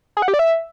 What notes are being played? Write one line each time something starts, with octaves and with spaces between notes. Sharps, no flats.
G#4
F#5
G4
D5
E5